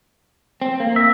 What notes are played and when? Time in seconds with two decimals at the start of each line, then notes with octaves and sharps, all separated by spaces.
0.62 C4
0.80 A#3
0.96 E5